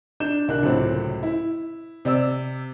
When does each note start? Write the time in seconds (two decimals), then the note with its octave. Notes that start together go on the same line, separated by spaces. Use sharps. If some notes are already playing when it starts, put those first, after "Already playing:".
0.20 D4 G6 E7
0.48 C2 D4 A#4 F#6
0.63 C#2 F#2 A2 C3 C4
1.23 E4
2.05 C3 D5 E6